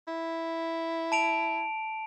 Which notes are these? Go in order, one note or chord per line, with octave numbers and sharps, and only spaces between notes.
E4
A5 D7 F7